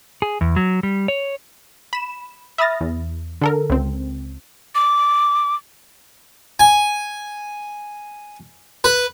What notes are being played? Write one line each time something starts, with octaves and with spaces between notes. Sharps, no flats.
G#4
E2
F#3
G3
C#5
B5 E7
E5 B5 D#6 F6 A6 A#6
E2
D3 A4 A#4
C#2 C4
D6
G#5
B4